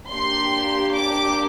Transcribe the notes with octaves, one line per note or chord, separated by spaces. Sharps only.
A#3 D4 G4 C6
D6